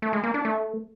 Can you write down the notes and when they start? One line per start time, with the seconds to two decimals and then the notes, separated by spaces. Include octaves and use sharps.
0.02 A3
0.13 G#3
0.24 A#3
0.34 D4
0.45 A3